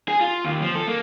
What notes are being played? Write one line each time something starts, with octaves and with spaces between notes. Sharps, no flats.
G#4
F4
D#2
F3
A4
A#3